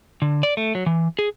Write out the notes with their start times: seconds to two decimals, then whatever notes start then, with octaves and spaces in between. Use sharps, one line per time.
0.22 D3
0.43 D5
0.57 A3
0.75 F#3
0.86 E3
1.19 G#4